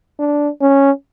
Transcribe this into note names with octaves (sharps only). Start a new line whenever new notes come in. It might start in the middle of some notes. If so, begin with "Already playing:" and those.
D4
C#4